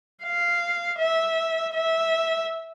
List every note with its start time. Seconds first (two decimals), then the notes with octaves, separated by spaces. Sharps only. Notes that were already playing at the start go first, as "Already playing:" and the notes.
0.23 F5
0.98 E5
1.74 E5